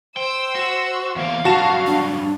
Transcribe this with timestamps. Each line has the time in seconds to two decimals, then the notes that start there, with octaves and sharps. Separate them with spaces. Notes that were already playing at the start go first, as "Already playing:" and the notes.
0.17 C5 G5 E6
0.55 F#4
1.16 E2 A#3 F5
1.45 G2 F#3 F#4 A5 E7
1.87 D4